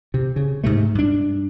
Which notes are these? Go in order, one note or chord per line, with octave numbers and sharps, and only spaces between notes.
C3
C#3
G#2 C3 A3
G2 D4